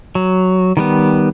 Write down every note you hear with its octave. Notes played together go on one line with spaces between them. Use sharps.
F#3
D#3 G3 B3